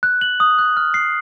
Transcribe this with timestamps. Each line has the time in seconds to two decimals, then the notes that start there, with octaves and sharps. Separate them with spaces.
0.03 F#6
0.21 F#7
0.40 D#6
0.59 F#6
0.77 F6
0.94 C7